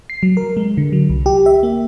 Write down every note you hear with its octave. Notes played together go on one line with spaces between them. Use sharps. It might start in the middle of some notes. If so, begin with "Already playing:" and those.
C7
F#3
A#4
G#3
D3
F#3
C2
G4
E5
A#3